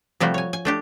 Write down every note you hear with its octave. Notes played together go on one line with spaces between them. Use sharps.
C3 F3 G3 A3 F#4
C#5 G#5
G#5
A3 D4 G4